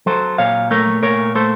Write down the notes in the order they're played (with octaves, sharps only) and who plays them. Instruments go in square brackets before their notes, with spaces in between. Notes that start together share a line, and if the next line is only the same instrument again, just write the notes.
[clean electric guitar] F#3 A4 C5
A#2 C#5 F5
A3 A#4 C#5
A#2 A#4 C#5
A3 A4 C5